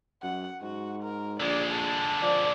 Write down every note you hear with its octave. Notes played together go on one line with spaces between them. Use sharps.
F#2 F#5
G#2 F#4
A#4
A#1 D3 G#3 D5
A5
F3 D5